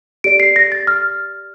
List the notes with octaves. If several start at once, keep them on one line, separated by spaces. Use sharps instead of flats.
G4 D5 D7
C7
A#6
A6
F6